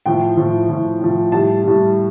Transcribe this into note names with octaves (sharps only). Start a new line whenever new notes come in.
A2 F3 G5
A2 F3
A2 F3
A2 F3
A2 G3 A5
A2 G3